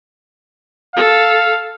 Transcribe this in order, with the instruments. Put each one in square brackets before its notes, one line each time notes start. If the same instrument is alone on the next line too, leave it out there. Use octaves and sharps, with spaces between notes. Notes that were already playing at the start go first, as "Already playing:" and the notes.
[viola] A4 [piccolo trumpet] F5